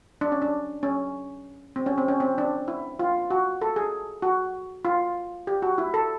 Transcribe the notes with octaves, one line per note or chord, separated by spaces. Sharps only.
D4
C#4
D4
C#4
C4
C#4
C4
C#4
C4
D4
E4
F4
F#4
A4
G#4
F#4
F4
G4
F#4
E4
A4